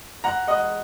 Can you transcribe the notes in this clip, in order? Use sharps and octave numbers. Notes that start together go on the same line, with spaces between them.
F#5 A#5
D#5 F#5